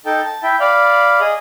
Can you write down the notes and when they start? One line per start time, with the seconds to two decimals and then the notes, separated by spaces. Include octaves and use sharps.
0.06 D#4 A4 G5 A5
0.25 A5
0.43 E4 E5 G5
0.60 D5 F5 B5
1.20 G#4 D#5